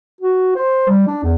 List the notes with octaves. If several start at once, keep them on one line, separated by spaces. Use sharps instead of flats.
F#4
C5
G3
D4
E2